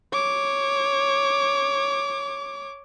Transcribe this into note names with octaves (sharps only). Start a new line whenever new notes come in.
C#5 D6